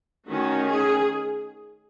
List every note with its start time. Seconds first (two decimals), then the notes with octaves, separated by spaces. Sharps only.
0.28 D#3 A3 C#4 F#4
0.66 G#4